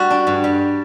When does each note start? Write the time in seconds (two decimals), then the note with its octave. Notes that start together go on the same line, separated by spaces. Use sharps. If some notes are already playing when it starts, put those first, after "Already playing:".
Already playing: G3 F#4
0.10 D4
0.27 G2
0.44 G3